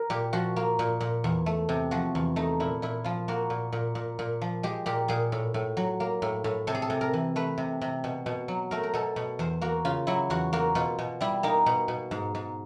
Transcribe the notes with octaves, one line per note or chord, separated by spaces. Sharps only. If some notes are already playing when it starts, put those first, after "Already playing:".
Already playing: A#4
A#2 G4
F3 F#4
A#3
A#2
A#2
E2
A3
C3
F3 F#4
E2
A3 D#4
A#2 E4
A#2 E4
F3 F4
A#3 F#4
A#2
A#2
A#2
A#2
F3
G#3 G4
A#2 G4
A#2 G#4
A2
A2
F#3
A#3
A2
A2
C3 A4
G#4
A4
C3
A#4
E3
A3 B4
C3
C3
B2
B2
F#3
A3 A#4
A#4
B2 A4
B2
E2 C5
A#3 F#4
C#3 F4
F#3 E4
E2 F#4
A#3 F#4
B2 F4
B2
G3 E4
A#3 D#4
B2
B2
G#2
G#2